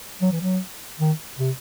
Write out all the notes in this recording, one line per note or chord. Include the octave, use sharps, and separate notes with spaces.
F#3
E3
F#3
D#3
C3